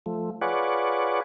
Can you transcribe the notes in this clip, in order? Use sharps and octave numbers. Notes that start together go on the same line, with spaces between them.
F3 A3
F4 G#4 B4 C#5 D5 F#5